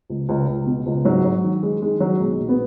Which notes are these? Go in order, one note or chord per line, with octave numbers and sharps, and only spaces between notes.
C#2
C#2
C#2
B2
C#2
G#2 F#3
F#3
D#3
F#3 G#3
D#3 G#3
D#3 F#3
B1 G#3
A#2
B3